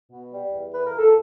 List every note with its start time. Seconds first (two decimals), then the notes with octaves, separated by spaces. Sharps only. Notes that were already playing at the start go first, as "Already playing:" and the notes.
0.11 B2
0.32 G3
0.52 E2
0.72 E3 B4
0.85 A#4
0.93 C#2 A4